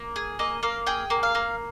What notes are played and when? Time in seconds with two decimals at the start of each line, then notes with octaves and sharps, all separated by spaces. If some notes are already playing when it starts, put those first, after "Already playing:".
Already playing: A#3
0.16 G#4
0.39 A#3 D#5
0.63 A#3 F5
0.87 G#4 G5
1.10 A#3
1.23 F5
1.35 A#3